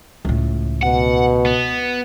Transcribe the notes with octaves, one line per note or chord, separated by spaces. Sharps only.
C#2 A2
B2 F#5
B3